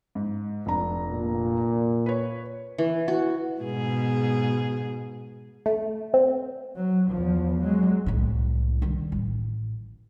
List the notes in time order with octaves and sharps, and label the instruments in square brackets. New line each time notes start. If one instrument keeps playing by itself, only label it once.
[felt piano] G#2
F1 D4 A#5
[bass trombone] A#2
[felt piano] B4 C#5
[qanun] E3
F#4
[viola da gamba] G#2 B2 G#4
[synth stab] A3
C4
[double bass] F#3
E2 F3
F#3 G#3
[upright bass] C2 A2
D#3 G3
A1